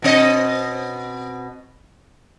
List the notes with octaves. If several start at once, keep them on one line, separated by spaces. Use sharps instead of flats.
B2 C4 D#5